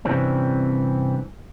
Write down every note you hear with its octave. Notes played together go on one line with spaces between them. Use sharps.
G2 C3 E3 G3 C4 C#4